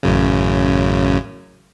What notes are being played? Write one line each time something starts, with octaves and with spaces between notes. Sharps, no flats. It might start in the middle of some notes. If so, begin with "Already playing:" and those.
A1 F#2 C#3